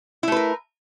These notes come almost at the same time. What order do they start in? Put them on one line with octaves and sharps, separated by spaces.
E4 A3 B4 A#4